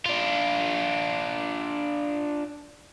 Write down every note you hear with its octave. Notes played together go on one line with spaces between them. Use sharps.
D4 F4